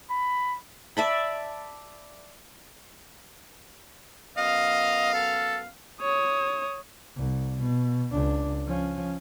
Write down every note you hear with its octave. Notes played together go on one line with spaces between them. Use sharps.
B5
D5 E5 A5 B5
F#2 B3 D#5 F5
A4
C#5 D#6
C2
B2
C#2 D4
F3 C#4